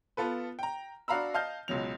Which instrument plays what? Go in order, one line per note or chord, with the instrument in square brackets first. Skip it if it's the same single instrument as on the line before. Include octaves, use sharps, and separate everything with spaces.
[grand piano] B3 F4 A4 B4
G5 A#5
D4 F#4 F5 A#5 B5 E6
D#5 F5 A5 F6 G6
C#2 B2 F#3 F7